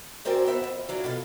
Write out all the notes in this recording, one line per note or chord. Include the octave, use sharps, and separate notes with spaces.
C4 C#4 F#4 A#4 C5 D5
B3 C5 E5
F2
E3 F#3 D4 F4
B2 F4 A4